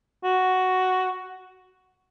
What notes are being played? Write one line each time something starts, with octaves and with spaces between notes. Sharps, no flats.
F#4